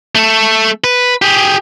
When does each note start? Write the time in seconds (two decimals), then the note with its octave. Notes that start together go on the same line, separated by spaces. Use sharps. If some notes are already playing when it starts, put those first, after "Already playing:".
0.15 A3 A4
0.84 B4
1.22 G4 G#4